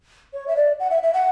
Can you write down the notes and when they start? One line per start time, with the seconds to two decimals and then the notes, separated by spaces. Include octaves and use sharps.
0.33 C#5
0.48 E5
0.56 D5
0.80 F#5
0.91 E5
1.03 E5
1.14 F#5